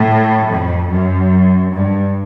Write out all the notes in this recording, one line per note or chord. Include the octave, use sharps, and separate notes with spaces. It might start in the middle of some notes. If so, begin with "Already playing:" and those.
Already playing: A2
F2
F#2
G2